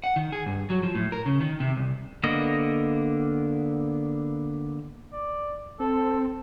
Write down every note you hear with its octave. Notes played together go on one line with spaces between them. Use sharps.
F#5
D#3
G#4
G2
F#3
F3
A2
A#4
C#3
D#3
C3
C2
D3 A#3 B3 D#5
D5
C4 A4